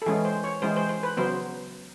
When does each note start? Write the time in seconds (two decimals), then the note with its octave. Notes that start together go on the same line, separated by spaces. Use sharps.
0.02 A4
0.06 E3 G#3 C#4 G#4
0.25 C5
0.44 C#5
0.62 E3 G#3 C#4 C5
0.76 C5
0.89 C5
1.03 B4
1.17 C#3 F#3 B3 C5